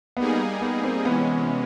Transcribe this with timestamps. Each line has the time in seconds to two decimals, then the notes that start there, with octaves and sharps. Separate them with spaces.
0.17 G3 A#3 B3 D#4 G#4
0.61 B3
0.84 C4
1.05 C3 E3 G#3 B3 C#4